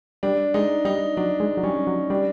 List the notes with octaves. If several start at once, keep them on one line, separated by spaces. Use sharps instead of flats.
G3 D4
G#3 D#4
G3 D#4
F#3 D4
G#3
F#3
G3 C#4
F#3
G3 D4